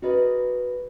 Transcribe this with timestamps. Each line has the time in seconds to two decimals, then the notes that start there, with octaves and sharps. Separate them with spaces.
0.02 F#4 G#4 A#4 B4 D5 D#5